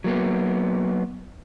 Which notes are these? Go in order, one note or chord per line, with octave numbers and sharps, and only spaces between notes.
F#3 A#3 B3